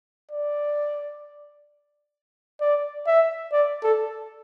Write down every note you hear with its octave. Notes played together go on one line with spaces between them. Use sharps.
D5
D5
E5
D5
A4